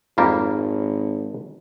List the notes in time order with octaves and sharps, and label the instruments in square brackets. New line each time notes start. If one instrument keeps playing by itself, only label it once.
[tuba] G#1 [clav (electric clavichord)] F2 G3 A#3